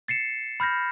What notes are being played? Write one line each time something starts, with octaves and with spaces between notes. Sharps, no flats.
A6 C7 C#7 E7
B5 F6 G6 A#6